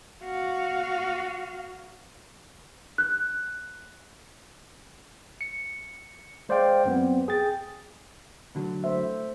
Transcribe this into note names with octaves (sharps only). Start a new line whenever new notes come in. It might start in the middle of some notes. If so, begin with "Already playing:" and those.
F#4 F5
F#6
C#7
G#3 C5 D5 F5 G5
F#2 B3 C4
G#4 G5 A6
D2 D3 F#3
A3 C5 E5